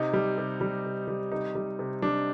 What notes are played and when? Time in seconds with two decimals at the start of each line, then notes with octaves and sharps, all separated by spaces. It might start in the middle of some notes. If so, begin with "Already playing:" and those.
Already playing: C3 D#4
0.13 G3
0.38 C3
0.61 G3
0.85 C3
1.08 G3
1.32 C3 D#4
1.55 G3
1.79 C3
2.02 G3 D4